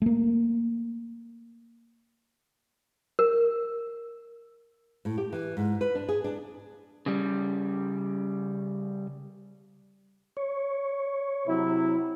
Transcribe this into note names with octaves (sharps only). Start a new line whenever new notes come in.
A3 A#3
A#4
A2
G4
E3
G#2
B4
D4
G#4
D4
C#3 G3
C#5
C3 F#3 E4